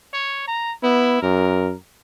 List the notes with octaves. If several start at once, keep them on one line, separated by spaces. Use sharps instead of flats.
C#5
A#5
B3 E4
F#2 A#4